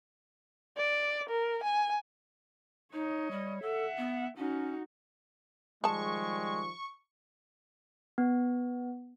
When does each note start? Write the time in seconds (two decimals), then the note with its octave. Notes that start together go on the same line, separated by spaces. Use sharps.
0.77 D5
1.29 A#4
1.63 G#5
2.93 D#4 C#5 D#5
3.31 G3
3.62 A4 E5 F#5
3.98 B3
4.37 C#4 D#4 F#4
5.84 D#3 F3 G3 G#3 G#4 A5 C#6
8.18 B3